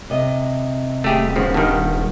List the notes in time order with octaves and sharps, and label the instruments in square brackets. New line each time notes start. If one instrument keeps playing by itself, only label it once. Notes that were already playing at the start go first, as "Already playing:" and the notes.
[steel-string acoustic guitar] C3 D#5
[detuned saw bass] D#1 [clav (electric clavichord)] A3 G4 G#4
[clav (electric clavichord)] G#1 C#3 F3 [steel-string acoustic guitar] B3 F#5
[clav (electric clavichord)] G2 D#3